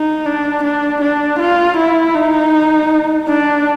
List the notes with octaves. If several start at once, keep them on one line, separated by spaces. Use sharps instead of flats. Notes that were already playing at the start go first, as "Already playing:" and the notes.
Already playing: D#4
D4
D4
D4
F4
E4
D#4
D4